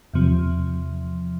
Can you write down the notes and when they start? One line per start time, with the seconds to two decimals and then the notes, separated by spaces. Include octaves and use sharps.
0.14 E2 C3 F3